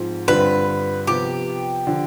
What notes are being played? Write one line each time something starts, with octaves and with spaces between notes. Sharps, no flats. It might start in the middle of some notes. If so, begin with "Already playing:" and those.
Already playing: G#2 F3 C4
G2 D3 G3 C4 F4 B4
C3 F3 B3 G4
D3 F3